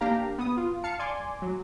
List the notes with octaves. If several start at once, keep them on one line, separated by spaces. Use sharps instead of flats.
A#3 D4 G4 F5 A#5
B3 D#6
F4
F5 A5 C#7
D5 G#5 C6 D6
F#3